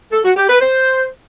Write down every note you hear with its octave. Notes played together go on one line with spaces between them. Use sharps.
A4
F#4
G4
B4
C5